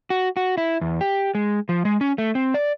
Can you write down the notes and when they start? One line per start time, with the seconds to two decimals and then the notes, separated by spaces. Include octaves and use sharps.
0.10 F#4
0.37 F#4
0.58 E4
0.81 E2
1.01 G4
1.35 G#3
1.69 F3
1.85 G#3
2.01 C#4
2.18 A3
2.35 C4
2.54 D5